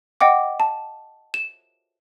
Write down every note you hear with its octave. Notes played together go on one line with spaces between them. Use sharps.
D#5 F#5 G5 D6
A5
E7